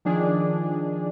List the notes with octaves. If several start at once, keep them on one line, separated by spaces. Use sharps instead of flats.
D#3 F3 D4 G#4